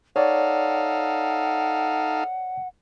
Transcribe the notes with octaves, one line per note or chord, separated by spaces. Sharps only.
D#4 A4 C#5 D5 F5 F#5